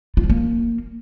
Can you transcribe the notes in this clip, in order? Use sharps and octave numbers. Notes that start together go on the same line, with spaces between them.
F4
F3
A#3